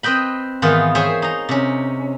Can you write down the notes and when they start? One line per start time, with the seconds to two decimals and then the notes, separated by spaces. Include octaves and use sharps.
0.03 C4 B4 D#5 G5 B5
0.62 G#2 D#3 E3 B3 F4 F5
0.95 G#4 C5 C#5 E5 G5 G#5
1.22 D#4 A#5
1.49 C3 C#4